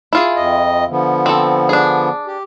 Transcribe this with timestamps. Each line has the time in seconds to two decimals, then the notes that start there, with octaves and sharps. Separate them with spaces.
0.13 E4 F4 G#4
0.36 F2 D#5
0.89 D3 F3 B3
1.26 C4 A4
1.69 D4 G#4
2.27 G4